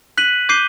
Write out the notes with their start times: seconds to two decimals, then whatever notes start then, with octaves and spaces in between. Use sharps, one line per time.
0.18 F#6 B6 D#7 F#7
0.49 D6 G6 C7 D#7 G7